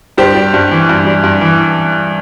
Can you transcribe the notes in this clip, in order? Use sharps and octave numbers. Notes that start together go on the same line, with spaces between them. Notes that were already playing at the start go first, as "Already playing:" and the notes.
G2 G4 C5
G3
G2
E3
G2
G3
G2
E3